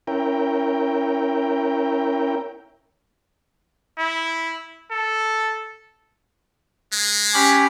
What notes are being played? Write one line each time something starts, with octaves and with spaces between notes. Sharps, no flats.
C#4 E4 A#4 G5
E4
A4
G#3
C#4 G4 B5